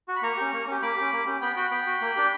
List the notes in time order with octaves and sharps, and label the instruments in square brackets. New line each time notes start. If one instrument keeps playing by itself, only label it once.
[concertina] F#4
B5
A#3 A#5 C#6
C#4 G4
A#3
C#4 G4
A#3 B5 D6
C#4 G4
A#3
C#4 G4
B3 G5 B5
F#4 G5 B5
B3 G5 B5
F#4
A#3
D4 G4